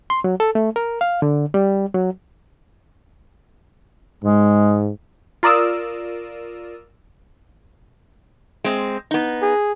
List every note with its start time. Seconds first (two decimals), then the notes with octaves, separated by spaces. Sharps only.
0.10 C6
0.24 F#3
0.40 A4
0.55 A3
0.76 A#4
1.01 F5
1.22 D3
1.54 G3
1.94 F#3
4.24 G#2 G#3
5.43 F4 A#4 D5 D#6 E6
8.64 G#3 C4
9.11 B3 D#4
9.42 G#4